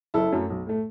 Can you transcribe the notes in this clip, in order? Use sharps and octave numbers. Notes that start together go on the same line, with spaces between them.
F#1 E4 A4
F#2 F#3 A3
B1
A2 A3